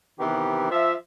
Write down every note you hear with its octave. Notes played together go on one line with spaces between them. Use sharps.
C3 D#3 E3 B3 G4
F3 E5